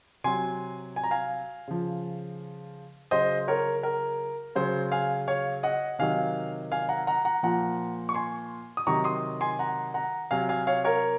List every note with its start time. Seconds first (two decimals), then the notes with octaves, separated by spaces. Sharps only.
0.24 C3 F#3 G#5 C6
0.96 G#5
1.04 A#5
1.11 F5 G#5
1.68 C#3 F3
3.11 C#3 F#3 C5 D#5
3.48 A#4 C#5
3.83 A#4
4.55 C#3 F#3 C5
4.92 F5 G#5
5.28 C#5 F5
5.63 D#5 F#5
5.99 C3 D#3 F#3 F5 G#5
6.72 F5 G#5
6.89 F#5 A#5
7.07 F#5 A#5
7.25 F#5 A#5
7.43 A#2 F3 F#5 A#5
8.09 C#6
8.15 G#5 C6
8.77 D#6
8.87 C3 D#3 F#3 A#5 C#6
9.04 C6 D#6
9.41 G#5 C6
9.59 F#5 A#5
9.94 F#5 A#5
10.31 C3 F#3 F5 G#5
10.49 F5 G#5
10.67 C#5 F5
10.84 A#4 C#5